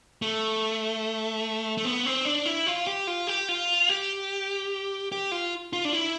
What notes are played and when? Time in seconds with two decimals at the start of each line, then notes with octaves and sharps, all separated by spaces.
0.22 A3
1.78 A3
1.85 B3
2.06 C4
2.25 D4
2.46 E4
2.67 F4
2.87 G4
3.07 F4
3.27 G4
3.49 F4
3.89 G4
5.12 G4
5.32 F4
5.73 F4
5.85 D4
5.93 E4